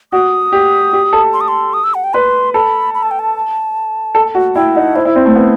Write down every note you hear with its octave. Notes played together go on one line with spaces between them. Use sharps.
F#4 D#6
G4
G4
A4
C6
D#6
C6
D#6
E6
F#5
G5
B4 C6
A4 B5
B5
A5
G5
A5
A4
F#4
E4 G5
D#4 F#5
E4 C5
E4
C4
A3
B3